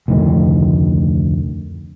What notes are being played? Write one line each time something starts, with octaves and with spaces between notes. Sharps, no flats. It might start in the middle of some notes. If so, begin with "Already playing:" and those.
F1 D2 A2 D#3